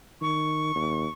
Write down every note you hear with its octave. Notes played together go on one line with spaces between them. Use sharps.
D#3 C#6
D#2